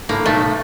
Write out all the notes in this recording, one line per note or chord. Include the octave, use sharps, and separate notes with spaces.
A2 A#3
B1 A3